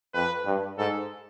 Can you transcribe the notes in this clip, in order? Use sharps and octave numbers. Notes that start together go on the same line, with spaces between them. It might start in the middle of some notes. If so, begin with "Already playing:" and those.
F2 B4
G2
G#2 A4